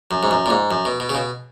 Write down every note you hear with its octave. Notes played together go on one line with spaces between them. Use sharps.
F#2
G#2
F#2
A#2
G#2
F#2
B2
B2
C#3
B2